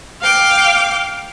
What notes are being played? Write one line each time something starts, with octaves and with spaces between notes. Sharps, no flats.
F5 G5 D6